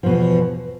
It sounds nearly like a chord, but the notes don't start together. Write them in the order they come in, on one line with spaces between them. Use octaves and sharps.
F3 B2 E2